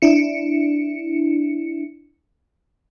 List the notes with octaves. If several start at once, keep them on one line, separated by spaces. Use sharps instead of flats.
D4 E4 C#7